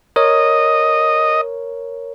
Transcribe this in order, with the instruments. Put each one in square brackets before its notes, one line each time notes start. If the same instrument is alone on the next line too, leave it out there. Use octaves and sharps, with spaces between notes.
[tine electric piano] A#4 C#5 [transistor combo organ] D#5